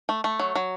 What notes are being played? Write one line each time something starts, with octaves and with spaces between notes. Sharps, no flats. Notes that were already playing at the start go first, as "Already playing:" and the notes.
A3
A3
F#3
F#3